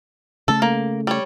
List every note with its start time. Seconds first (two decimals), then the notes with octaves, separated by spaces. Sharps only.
0.48 C#3 A3 A4
0.62 A#3
1.07 G3 C#5